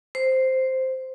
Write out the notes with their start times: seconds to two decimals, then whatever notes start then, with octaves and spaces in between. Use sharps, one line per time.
0.15 C5